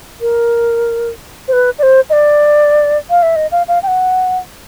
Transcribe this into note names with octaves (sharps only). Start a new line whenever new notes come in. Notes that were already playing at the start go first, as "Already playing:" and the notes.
A#4
C5
B4
D5
C5
D#5
D5
F5
E5
D#5
F5
F5
G5
F#5